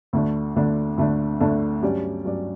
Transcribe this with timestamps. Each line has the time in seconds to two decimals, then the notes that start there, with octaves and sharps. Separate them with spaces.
0.13 D2 D3 A3 D4
0.56 D2 D3 A3 D4
0.98 D2 D3 A3 D4
1.40 D2 D3 A3 D4
1.82 G2 F#3 C#4 G4 D5
2.25 G2 F#3 C#4 G4 D5